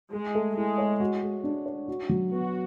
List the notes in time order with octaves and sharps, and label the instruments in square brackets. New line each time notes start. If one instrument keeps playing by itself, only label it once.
[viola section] G#3 [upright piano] G#4
[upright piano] A3
[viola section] G#3 [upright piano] E4
[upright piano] C#5
F#4
G#3
D4
C#5
F#4
F#3
[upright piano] B3 [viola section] F#4